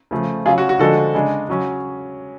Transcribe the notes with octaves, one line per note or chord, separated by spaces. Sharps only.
C#3 F3 A3
C#3 F#3 C#4 F4 G#4
F#4
F#4
D3 F3 G#3 D4 F#4 A4
C#3 G#3 D4
C#3 F#3 C#4